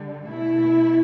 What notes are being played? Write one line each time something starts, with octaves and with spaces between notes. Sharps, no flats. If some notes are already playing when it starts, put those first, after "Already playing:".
Already playing: D3 G3
B2 A3 E4